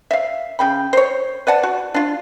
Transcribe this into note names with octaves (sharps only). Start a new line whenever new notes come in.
E5 F5
C#3 G5 B5
C5 C#5
B4 D5 F#5 A5
F#4
D4 F4